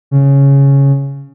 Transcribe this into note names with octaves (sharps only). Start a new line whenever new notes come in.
C#3